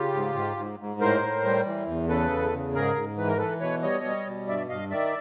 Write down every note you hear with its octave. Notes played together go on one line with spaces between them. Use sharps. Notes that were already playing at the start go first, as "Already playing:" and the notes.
Already playing: C#3 F4 G4
G#2
G#2
G#2
G#2
A2 A#4 C5
A2
G3
E3
E2
C#3 A4 B4
E2
C#3
G#2 G#4 A#4
G#2
E3 B4
A#4
E3 A4 B4
B2 B4 C#5
G3 C#5 D#5
G3
B2
G2 D5 E5
G2 D#5 F5
D#3 D5 E5